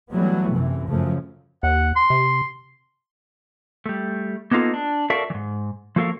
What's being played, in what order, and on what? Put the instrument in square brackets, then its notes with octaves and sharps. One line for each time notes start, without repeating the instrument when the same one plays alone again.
[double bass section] E3 F#3 G3 A3 B3
F#2 C3 E3
F#2 C#3 F3 A3
[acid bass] D#2 [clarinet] F#5
[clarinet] C6
[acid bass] C3
[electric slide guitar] G3 A3
A#3 B3 D#4 F4 A4
D4
F#4 A4 A#4 D5 E5 F5
G#2 E3
F3 A#3 F#4 A4 A#4 F5